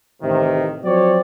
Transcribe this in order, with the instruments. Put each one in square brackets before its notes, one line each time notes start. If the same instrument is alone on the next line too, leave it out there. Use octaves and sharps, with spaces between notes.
[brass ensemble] A1 C3 D#3
F3 F#3 C4 F#4 C#5 D5